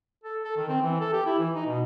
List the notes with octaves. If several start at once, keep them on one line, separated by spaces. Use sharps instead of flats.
A4
A4
D#3
C4
E3
A4
G4
E4
E3
D#4
B2